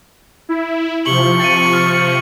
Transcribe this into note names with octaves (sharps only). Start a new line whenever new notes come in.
E4
C3 F3 C#6 F#7 G7
A6 C#7 D#7
F6